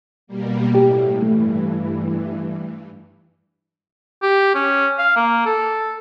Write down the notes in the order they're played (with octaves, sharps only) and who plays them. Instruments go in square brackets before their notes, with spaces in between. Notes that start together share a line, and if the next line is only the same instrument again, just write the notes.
[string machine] B2 G3 A#3
[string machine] A2 [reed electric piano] G4
[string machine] G2 E3 [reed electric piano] A3
[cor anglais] G4
C#4
F5
A#3
A4